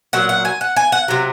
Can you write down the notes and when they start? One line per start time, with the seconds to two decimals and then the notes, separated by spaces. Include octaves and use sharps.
0.13 A#2 F#3 F#5
0.29 F#5
0.45 G#5
0.61 F#5
0.76 G#5
0.92 F#5
1.08 C3 F#3